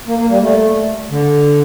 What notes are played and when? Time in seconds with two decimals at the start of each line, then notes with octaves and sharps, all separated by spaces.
0.07 A#3
0.18 A#3
0.30 G3
0.42 A3
1.11 D3